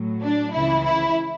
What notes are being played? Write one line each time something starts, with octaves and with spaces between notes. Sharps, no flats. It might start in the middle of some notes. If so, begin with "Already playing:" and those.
Already playing: A2 F#3
D4
C#2 C#3 E3 E4
E4